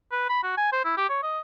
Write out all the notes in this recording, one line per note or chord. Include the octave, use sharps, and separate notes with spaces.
B4
B5
F#4
G#5
C5
E4
G4
C#5
D#5